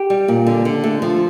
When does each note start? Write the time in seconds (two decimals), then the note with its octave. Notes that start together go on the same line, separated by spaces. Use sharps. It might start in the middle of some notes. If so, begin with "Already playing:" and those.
Already playing: G4
0.10 G3
0.28 A#2
0.47 D3
0.65 D3
0.84 A3
1.02 F3